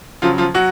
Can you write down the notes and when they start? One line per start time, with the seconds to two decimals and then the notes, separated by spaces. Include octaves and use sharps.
0.22 C#3 F3 F#3 F4
0.38 F3 F4
0.54 F#3 F#4